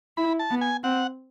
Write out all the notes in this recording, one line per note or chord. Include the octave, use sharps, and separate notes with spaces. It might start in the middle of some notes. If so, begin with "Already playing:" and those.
E4 B5
A5
B3
G#5
C4 F#5